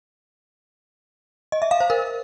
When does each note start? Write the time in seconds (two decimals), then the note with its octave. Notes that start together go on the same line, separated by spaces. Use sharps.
1.52 D#5
1.62 E5
1.71 F5
1.80 C5
1.90 A#4